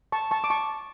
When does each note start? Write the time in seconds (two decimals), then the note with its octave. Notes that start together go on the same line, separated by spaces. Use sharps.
0.12 A5 C#6
0.31 A5 C#6
0.44 D6
0.50 A5 C#6